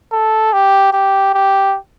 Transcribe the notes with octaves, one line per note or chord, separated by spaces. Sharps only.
A4
G4
G4
G4